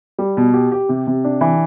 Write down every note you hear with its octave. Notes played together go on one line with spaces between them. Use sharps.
G3
B2
G4
G4
C3
C3
D4
E3